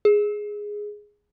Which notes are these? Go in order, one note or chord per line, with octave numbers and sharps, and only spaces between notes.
G#4